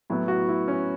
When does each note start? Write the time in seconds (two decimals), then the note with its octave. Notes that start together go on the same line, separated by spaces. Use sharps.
0.10 A2 F#3 B3 E4
0.28 F#4
0.48 E4
0.68 C#4